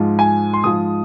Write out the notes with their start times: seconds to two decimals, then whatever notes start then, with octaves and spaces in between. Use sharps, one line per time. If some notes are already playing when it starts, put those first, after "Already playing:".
Already playing: G#2 F3 G#3
0.19 G#5
0.53 C6
0.64 G#2 F3 G#3 D#6